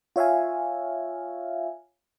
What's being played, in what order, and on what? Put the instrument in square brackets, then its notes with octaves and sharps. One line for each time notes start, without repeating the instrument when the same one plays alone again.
[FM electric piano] F4 C#5 E5 F5 G#5